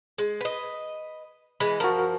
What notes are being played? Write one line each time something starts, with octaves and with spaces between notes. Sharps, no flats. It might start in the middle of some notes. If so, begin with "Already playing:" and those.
G#3
B4 D#5
E3 G#3 B5
F3 F#4 A#4